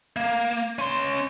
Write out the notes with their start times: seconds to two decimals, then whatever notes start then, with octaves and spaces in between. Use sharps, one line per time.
0.16 A#3
0.79 C#4 C6